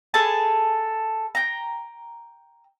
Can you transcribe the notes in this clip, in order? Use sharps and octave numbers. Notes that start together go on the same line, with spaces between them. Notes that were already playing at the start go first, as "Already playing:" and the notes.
G#4 A4 B4 A5
G5 A#5